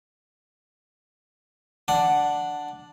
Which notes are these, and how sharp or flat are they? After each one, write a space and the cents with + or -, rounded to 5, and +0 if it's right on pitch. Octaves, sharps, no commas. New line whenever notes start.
D4 +0 F#5 +0